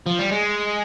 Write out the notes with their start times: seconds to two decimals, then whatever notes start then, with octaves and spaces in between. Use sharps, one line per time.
0.06 F3
0.19 G3
0.31 G#3